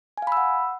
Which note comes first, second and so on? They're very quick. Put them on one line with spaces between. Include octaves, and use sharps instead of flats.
G#5 F5 B5 E6 F#5